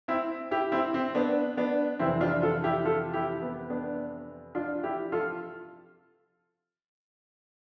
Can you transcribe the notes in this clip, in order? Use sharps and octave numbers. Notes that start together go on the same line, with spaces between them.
C4 E4
E4 G4
C4 E4
C4
B3 D4
B3 D4
F2 C3 E3 C4 E4
D4 F4
F4 A4
E4 G4
F4 A4
E4 G4
B3
B3 D4
D4 F4
E4 G4
F4 A4